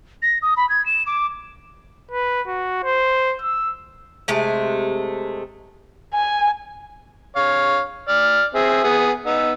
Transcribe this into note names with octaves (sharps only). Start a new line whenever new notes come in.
A#6
D#6
B5
G#6
E7
D6
B4
F#4
C5
E6
C3 G#3 A3
G#5
C#5 F5
D5 F6
C4 G#4 E5
B3 G#4
B3 D#4 E6